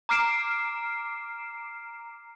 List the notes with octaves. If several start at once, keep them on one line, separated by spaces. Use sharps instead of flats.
A#5 D6 F6 C7 D7 E7